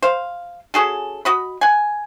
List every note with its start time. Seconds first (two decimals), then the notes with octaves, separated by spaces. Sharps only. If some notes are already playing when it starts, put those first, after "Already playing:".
0.02 C5 F5
0.74 C#4 F#4 G#4 A4
1.25 F#4 D#5 B5
1.61 F#5 G#5